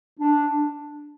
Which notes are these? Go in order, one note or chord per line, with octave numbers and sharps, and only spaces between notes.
D4